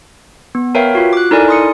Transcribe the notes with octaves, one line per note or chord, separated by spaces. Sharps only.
B3
A#4 B4 C#5 E5 F5 G5
F4 F#4
D6 F#6
D#4 E4 A4 A#4 D5 G#5
C6 D#6 C#7